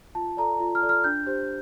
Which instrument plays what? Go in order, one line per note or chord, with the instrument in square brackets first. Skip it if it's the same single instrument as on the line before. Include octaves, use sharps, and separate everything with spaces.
[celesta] F4 A5
A4 D5 A#5
F4
F6
A4 D5
F6
D4 G6
G4 C5